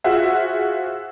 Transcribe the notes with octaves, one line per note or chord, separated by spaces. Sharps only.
F4 F#4 G#4 C5 E5 F#5